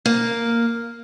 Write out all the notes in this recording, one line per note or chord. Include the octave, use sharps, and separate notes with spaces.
A#3